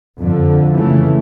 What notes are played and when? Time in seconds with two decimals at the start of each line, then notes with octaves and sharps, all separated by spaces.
0.20 F2 D3
0.74 C#3 E3 A3